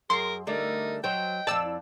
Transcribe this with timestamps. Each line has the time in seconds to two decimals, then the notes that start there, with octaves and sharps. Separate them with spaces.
0.10 F#2 G#4 A#4 C6
0.47 D3 G3 A3 D#4 A#4
1.04 F#3 C5 D#5 G5
1.47 F2 D5 A5 E6
1.64 E4